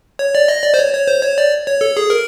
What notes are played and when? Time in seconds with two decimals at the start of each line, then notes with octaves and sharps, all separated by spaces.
0.19 C#5
0.35 D5
0.48 D#5
0.64 D5
0.74 C5
0.79 C#5
0.94 C#5
1.08 C5
1.23 C#5
1.38 D5
1.67 C#5
1.81 A4
1.97 G#4
2.10 A#4